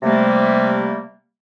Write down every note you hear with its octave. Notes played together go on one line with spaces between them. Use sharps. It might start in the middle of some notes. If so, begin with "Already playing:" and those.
C3 G3 A3 A#3